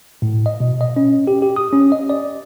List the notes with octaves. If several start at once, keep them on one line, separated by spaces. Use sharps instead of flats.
A2
D#5
B2
D#5
C#4
G4
G4
D#6
C#4
D#5
D5